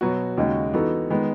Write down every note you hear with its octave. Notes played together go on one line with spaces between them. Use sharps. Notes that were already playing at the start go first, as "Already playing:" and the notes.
B2 F#3 B3 F#4
D#2 C#3 G#3 D#4 F#4
E3 B3 D#4 F#4 A4
D#3 G#3 B3